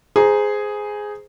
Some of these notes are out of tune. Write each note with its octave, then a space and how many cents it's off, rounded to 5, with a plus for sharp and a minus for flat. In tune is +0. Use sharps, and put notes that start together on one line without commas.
G#4 +0 C5 -20 A#5 +0